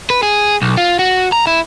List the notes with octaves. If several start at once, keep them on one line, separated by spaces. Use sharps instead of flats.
B4
G#4
B1
F4
F#4
A#5
E4